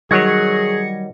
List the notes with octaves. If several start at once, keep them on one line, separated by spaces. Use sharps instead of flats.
D#3 F#3 G3 G#4 C#5 G#6 A#6 C#7